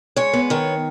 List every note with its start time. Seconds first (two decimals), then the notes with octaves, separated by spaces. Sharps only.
0.16 G#3 C#5
0.33 B3
0.50 D#3 C#5